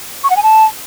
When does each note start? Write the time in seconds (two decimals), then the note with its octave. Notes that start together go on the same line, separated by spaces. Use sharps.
0.24 C#6
0.30 F#5
0.36 G#5
0.43 A5